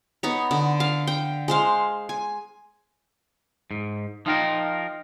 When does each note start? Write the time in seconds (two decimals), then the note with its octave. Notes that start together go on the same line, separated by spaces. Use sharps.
0.23 B3 D#4 C#5
0.51 D3
0.80 F5
1.07 G5
1.48 G#3 C5 F5
2.09 G#5
3.71 G#2
4.26 F3 D#4 F4 A#4 G5